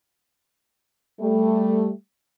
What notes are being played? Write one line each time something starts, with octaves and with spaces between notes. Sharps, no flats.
G3 A3